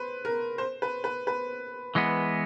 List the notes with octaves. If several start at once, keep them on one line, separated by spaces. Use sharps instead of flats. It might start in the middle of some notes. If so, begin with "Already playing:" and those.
Already playing: B4 C5
A#4
C5
B4
B4
B4
E3 G#3 B3